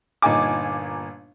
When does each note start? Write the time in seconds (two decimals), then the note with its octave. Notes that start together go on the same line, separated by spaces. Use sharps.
0.22 G1 A#2 D#4 G#5 D6